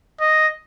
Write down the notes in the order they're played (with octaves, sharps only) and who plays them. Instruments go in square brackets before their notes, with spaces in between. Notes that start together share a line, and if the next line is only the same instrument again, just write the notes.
[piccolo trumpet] D#5